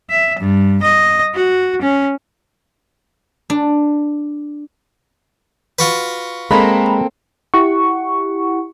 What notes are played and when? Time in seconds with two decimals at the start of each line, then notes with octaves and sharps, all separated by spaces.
0.10 E5
0.39 G2
0.83 D#5
1.35 F#4
1.82 C#4
3.50 D4
5.79 F4 F#4 B4
6.51 G#3 A#3 C4 A4 A#5 B5
7.54 E4 G4 F#5 C#6